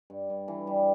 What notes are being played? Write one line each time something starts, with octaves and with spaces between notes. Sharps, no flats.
G2
G2
E3
G3